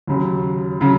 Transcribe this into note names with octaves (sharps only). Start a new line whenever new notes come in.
D#2 C#3 F#3
C#3 F#3